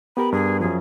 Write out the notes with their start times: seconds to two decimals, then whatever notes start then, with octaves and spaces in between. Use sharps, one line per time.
0.17 B3 G4 A#4 B5
0.32 G2 G#4
0.60 F#2 F3 G#4